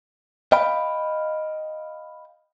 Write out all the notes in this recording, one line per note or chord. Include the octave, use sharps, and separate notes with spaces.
D#5 F5 G5 B5